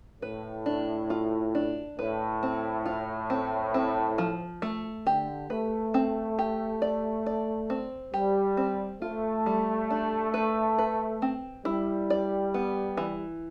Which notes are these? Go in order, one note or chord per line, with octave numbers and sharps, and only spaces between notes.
A2 B4
D4
F4
D4
A2 B4
C4
F4
C4
C4
F3
A3
D3 G4
A3 B4
C4
G4
D5
D5
C4
G3 G4
C4
A3 F4
G3
D4
B4
B4
C4
G3 E4
D5
B3
E3